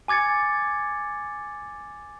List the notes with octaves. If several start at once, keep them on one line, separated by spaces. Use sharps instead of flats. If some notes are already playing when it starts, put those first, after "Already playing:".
G#5 D6 G#6 A6 C#7